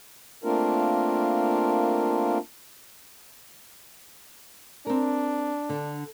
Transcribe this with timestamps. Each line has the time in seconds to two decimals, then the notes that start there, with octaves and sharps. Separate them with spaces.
0.44 A3 A#3 C4 D4 F4 A#4
4.87 C4 D4 A#4
5.69 D3